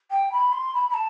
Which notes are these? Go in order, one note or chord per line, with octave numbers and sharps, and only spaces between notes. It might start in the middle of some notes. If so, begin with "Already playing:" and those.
G5
B5
C6
B5
B5
A5